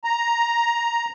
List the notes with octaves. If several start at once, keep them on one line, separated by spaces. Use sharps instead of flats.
A#5